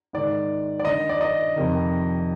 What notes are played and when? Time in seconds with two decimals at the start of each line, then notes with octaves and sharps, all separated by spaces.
0.13 G#2 D#3 D5
0.79 D5
0.85 G2 D#3 D#5
1.09 D5
1.21 D#5
1.56 F2 C3 D#3